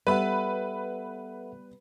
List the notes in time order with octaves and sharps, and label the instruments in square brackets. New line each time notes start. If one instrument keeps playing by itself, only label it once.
[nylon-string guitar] G3 B3 [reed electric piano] A4 E5 F#5 [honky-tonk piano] B4 B5